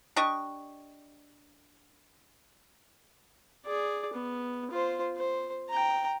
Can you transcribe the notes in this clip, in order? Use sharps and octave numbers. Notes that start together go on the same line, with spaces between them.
D4 G4 D#5 C#6
G#4 D5
B3
F4 C5
C5
G5 A#5